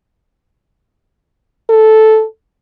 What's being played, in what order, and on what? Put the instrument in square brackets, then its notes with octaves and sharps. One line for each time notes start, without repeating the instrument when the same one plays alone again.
[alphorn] A4